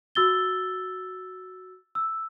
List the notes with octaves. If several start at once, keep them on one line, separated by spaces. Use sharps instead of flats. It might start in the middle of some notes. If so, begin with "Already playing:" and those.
F#4 E6 A6 G7
E6